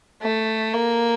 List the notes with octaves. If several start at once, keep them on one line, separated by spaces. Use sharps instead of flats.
A3
A#3